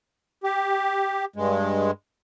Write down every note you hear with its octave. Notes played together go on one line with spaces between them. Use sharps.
G4
G2 G#3